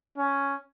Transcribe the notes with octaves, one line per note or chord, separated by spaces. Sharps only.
C#4